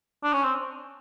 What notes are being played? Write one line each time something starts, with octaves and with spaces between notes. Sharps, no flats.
D4
C#4
C4